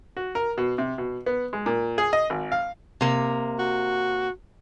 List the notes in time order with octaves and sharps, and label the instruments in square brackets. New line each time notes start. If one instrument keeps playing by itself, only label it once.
[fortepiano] F#4
A#4
B2
C3
B2
B3
G#3
A#2
G#4
D#5
G#1
F5
[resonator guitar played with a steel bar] C3 A#3
[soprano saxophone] F#4